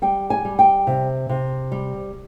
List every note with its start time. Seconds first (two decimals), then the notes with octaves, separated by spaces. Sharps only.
0.02 G3 G5
0.30 G#5
0.45 G3
0.59 G5
0.87 C3
1.29 C3
1.72 G3